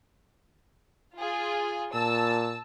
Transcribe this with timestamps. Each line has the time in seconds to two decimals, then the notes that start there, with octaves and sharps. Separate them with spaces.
1.17 F4 G#4
1.94 A#2 A5 E6